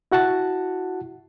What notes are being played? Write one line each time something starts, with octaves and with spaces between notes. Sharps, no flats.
E4 F#4 F#5 A5